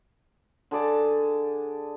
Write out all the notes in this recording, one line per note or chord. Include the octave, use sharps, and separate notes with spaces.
D3 G#4 D5 A5